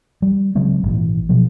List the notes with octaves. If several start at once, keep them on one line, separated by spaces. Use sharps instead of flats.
G3
C#3 F#3 G#3 C4
G#1 A#2 E3
B2 F3 F#3